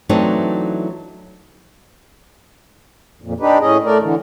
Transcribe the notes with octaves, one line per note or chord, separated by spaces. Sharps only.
E3 F#3 A3 C4 D4 D#4
F2 A#2
D4 D#4 G4 B4
A2 C#4 G#4 D#5
A3 A#4 D5
D3 E3